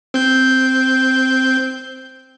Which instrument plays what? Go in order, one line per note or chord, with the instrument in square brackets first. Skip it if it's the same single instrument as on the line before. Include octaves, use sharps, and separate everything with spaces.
[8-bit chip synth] C4 G6